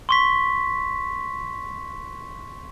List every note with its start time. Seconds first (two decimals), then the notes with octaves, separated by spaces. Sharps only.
0.09 C6 C#6 B6